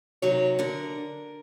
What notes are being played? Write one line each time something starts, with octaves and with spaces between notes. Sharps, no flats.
C3 D#3 F#3 C#5
D3 A#4